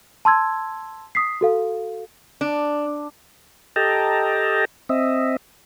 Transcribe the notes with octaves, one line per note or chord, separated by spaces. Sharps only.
A5 C6 E6 G#6
D#6 B6 C7
F#4 A4 F5
D4
G4 A4 D#5 G5 A5 A#5
C4 D#5 E5